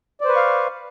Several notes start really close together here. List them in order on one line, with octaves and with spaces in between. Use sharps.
D5 C5 B4 C#6 F5